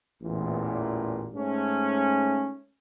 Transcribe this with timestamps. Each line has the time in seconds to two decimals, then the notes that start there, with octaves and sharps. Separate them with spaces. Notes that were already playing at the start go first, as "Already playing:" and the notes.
0.22 A1 E2 A#2
1.35 G#2 A3 C#4